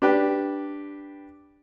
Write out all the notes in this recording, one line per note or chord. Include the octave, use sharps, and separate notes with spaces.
D4 G4 B4